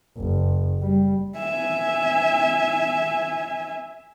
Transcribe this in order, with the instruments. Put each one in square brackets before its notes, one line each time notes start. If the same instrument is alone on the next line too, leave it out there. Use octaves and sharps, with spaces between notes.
[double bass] F#1
G3
[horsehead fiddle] E5 G#5